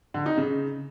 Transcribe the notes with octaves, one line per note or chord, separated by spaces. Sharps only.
D3
D#4
C#3